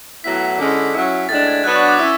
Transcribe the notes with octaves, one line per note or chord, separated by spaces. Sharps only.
A2 F#3 B3 E4 B6
D3 G#3 C#4 E4
F#3 C#4 E4
A2 G#3 D4 A6
G#6
F#3 B3 D4 F#6
C#6
D6
C#4 E4 E6